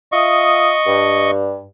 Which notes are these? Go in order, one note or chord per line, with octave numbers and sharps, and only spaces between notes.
F4 D#5 E5 C#6 D#6
G2